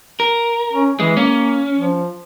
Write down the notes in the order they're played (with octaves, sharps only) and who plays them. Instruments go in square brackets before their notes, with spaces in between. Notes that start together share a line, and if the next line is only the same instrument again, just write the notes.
[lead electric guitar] A#4
[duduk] C#4
[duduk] E3 [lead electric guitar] G#3
[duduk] A#3 [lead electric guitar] C#4
[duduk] F3